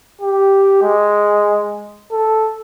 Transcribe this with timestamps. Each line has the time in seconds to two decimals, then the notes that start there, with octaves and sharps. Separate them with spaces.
0.21 G4
0.82 G#3
2.12 A4